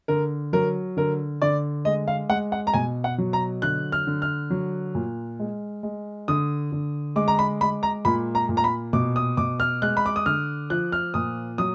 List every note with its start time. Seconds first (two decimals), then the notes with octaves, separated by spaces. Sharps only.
0.08 D3 A#4
0.53 F#3 A#4
0.97 D3 A#4
1.42 D3 D5
1.85 G#3 D#5
2.08 F5
2.29 G#3 F#5
2.52 F#5
2.67 A#5
2.74 B2 G#5
3.04 F#5
3.18 F#3
3.33 A#5
3.62 D3 F#6
3.92 F6
4.07 D3
4.22 F6
4.50 F#3
4.95 A#2
5.39 G#3
5.83 G#3
6.28 D3 D#6
6.72 D3
7.16 G#3 D6
7.28 A#5
7.39 B5
7.61 G#3 B5
7.83 A#5
8.05 A#2 B5
8.35 A#5
8.49 A#2
8.57 A#5
8.64 B5
8.93 B2 D6
9.16 D#6
9.37 B2 D6
9.60 F6
9.82 G#3 F#6
9.97 B5
10.06 D6
10.16 D#6
10.26 D3 F6
10.70 F3 F#6
10.92 F6
11.14 A#2 D#6
11.58 F#3 D#6